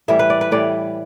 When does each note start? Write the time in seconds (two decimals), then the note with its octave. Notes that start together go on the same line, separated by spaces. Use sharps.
0.08 A2 E3 G3 E5
0.19 B4
0.30 D5
0.41 B4
0.51 A2 E3 G3 D5